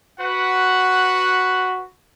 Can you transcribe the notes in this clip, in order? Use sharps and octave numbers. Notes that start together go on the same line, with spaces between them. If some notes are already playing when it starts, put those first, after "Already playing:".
F#4 B4 F#5